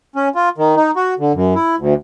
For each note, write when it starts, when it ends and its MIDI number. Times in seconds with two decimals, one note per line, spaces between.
0.16 0.28 61
0.35 0.49 65
0.58 0.75 51
0.76 0.91 63
0.96 1.14 66
1.19 1.32 50
1.34 1.54 42
1.55 1.75 64
1.79 1.94 38